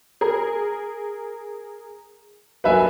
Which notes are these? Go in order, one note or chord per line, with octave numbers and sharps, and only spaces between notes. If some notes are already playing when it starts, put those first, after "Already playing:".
G#4 A#4
G2 F#3 A#3 B4 E5 G#5